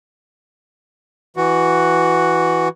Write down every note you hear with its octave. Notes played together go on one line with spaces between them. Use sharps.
E3 F#4